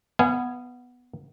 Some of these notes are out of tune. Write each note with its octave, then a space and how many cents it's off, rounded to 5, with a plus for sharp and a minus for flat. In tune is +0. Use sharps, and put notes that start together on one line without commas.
B3 +0 F5 -30 G#5 +0